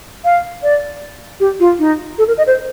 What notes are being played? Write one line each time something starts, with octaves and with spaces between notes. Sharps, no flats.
F5
D5
G4
F4
D#4
A4
A#4
D#5
C5